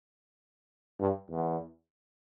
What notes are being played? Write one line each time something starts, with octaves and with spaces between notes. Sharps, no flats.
G2
E2